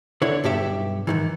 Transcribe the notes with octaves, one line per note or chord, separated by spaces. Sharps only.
D3 E4 C#5
B1 G2 G4 E5
G#2 D#3 E3